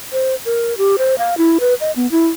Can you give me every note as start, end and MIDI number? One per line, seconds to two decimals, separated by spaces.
0.12 0.35 72
0.45 0.77 70
0.78 0.96 67
0.98 1.15 72
1.18 1.34 77
1.38 1.58 64
1.60 1.74 71
1.80 1.92 75
1.96 2.10 59
2.11 2.28 64